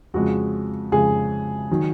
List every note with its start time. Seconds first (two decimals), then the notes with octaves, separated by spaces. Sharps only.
0.14 F2 C#3 G#3 F#4
0.92 F2 C#3 G#3 G#4
1.71 D#3 F#3